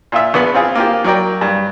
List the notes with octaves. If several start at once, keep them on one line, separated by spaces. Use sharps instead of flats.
A#2 F4 E5
A#1 B3 B5
C4 F4 G#4
A#3 F4 G4
F#3 A#4 D5 G5
G2